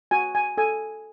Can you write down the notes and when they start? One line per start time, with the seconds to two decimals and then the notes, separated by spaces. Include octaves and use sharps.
0.11 F#4 G#5
0.35 G#5
0.58 A4 G#5